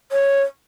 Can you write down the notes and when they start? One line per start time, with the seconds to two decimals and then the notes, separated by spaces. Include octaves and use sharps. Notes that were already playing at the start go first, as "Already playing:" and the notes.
0.12 C#5